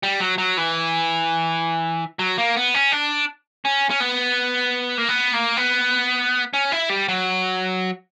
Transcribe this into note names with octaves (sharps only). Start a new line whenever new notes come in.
G3
F#3
F#3
E3
F#3
A#3
B3
C#4
D4
C#4
C#4
B3
A#3
B3
A#3
B3
C#4
E4
G3
F#3